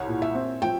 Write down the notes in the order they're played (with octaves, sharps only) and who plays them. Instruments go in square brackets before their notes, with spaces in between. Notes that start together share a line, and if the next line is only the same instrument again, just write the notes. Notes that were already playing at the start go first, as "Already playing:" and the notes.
Already playing: [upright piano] C2 [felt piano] C#5
[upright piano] A#2
[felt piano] E5
[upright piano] C4
[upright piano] F3 [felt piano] G5